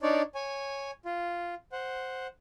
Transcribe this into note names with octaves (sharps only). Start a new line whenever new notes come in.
D4 D#4 C#5 D5
C#5 G#5
F4
C5 F#5